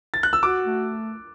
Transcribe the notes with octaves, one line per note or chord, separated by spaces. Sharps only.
A6
F#6
E6
F#4 D6
A3